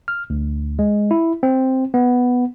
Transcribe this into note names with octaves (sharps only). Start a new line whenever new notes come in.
F6
D2
G#3
E4
C4
B3